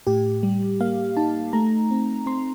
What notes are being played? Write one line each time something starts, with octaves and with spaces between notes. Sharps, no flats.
A2 G4
G3
A#3 F5
D#4 A5
A3 A#5
C4
C4 C6